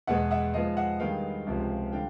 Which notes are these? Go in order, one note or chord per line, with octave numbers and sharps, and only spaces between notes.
E2 B2 G#3 B3 E5 F#5
E5 F#5
G#2 F3 G#3 B3 D#5 F5
E5 F#5
G2 D#3 G#3 B3 F5 G5
C#2 C3 F3
D3 G3 F5 G5